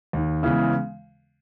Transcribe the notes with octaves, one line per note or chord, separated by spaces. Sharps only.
D#2
C#3 E3 G#3 B3